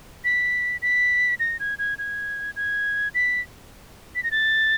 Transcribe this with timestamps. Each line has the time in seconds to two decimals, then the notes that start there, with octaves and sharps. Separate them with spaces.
0.24 B6
0.82 B6
1.40 A#6
1.60 G#6
1.79 G#6
1.98 G#6
2.56 G#6
3.15 B6
4.15 B6
4.24 A#6
4.31 A6